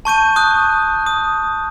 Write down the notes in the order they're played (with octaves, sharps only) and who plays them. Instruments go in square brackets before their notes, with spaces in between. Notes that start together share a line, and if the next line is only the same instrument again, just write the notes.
[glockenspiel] A5 C#6 G6 D#7
C#6 D#6 F#6
D#6